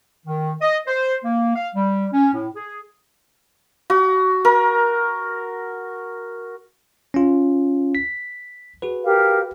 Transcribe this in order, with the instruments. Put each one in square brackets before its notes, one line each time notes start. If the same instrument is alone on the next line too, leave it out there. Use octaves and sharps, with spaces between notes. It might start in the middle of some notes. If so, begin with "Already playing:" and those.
[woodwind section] D#3
D#5
C5
A#3
F5
G3
C#4
A2
G#4
[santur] F#4
A#4
[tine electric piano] C#4 F4
B6
F#4 G#4 B4
[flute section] G4 A#4 F5